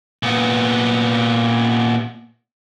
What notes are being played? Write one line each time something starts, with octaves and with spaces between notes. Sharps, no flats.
A#2 B3